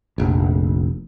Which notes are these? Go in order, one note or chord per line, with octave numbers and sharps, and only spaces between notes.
F1 A#1